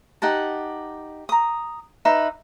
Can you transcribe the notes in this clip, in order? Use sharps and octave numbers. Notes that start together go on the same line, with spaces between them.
D#4 G4 F#5 A5
A#5 D#6
D#4 B4 E5 D6